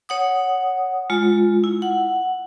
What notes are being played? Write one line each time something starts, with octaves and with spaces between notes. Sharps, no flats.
C#5 F#5 D#6
G#3 F4
E4
F#5